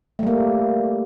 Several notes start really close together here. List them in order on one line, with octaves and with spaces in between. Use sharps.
A3 G3 A#3